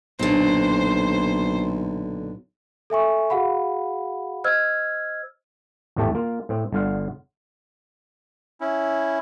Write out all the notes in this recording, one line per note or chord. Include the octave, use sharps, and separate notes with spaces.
B1 A#2 D3 C5
A4 E5 G#5 C#6
F#4 G#4 F5 F#5 B5
C5 D#5 E6 F6 G#6
G#1 E2 A2 A3 G4 A5
A#3 F4
A2 C4
G1 D3 F4 F5 F#5
C#4 E4